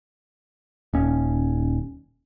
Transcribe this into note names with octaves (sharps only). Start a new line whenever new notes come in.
D#1 C#4